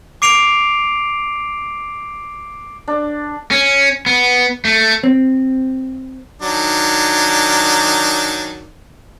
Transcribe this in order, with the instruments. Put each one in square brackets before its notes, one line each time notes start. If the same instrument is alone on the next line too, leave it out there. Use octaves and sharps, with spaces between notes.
[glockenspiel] D6 C7 D7 F7
[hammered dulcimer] D4
[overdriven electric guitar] C#4
B3
A3
[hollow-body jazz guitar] C4
[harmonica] D#3 F#3 D4